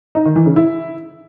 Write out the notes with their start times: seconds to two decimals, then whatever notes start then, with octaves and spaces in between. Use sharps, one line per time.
0.15 D#4
0.25 D#3
0.36 E3
0.46 C#3
0.56 E4